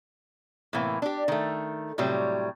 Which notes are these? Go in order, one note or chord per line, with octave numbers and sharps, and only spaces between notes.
A2 C3 E3 A#3
D4 G4
D#3 A3
A2 C3 F#3 G3